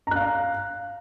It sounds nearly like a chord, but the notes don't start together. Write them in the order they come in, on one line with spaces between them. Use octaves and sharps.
A#5 F#6 F5